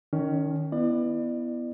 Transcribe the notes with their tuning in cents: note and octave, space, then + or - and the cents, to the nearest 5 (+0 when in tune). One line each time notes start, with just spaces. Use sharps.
D#3 -10 C#4 +20
B3 +0 E4 +10 D5 +35